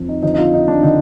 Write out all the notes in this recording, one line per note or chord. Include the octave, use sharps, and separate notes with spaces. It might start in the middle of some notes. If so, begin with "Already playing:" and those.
Already playing: F2
D#4
F2 D3 D#4
D#4
F4
D#4
D4
D3 D#4